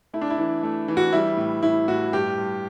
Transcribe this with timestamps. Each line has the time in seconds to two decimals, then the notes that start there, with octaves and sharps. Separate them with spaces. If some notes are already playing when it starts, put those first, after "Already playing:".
0.13 A3 E4
0.21 D4
0.30 E4
0.38 E3
0.63 A3
0.88 E3
0.97 F#4
1.13 G3 E4
1.37 A2
1.62 A2 E4
1.88 A2 F#4
2.13 G2 G4
2.38 G2